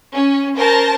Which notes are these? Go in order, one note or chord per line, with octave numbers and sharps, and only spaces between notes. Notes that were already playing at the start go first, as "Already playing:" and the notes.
C#4
C#4 A#4 C5 A5 A#6